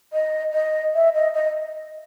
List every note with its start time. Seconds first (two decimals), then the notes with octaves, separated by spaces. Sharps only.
0.13 D#5
0.53 D#5
0.95 E5
1.15 D#5
1.34 D#5